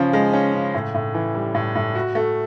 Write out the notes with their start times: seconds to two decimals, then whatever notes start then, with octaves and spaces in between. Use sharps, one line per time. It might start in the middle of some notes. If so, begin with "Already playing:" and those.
Already playing: C#3 F3 C#4
0.13 G#3
0.33 C#4
0.54 C#3
0.74 A2
0.94 A2
1.14 E3
1.35 G3
1.55 A2
1.75 A2
1.95 F#4
2.15 A3